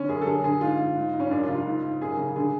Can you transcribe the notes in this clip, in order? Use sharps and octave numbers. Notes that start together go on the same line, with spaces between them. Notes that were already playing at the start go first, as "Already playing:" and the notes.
Already playing: D3 C#4
F#2 G#4
A4
D3 G#4
D3 G#4
G#2 F4
G#2
G#2
G#2
C#4
F#2 D4
F4
C#3
F4
G#2
G#2
F#2 G#4
C#3
D3 G#4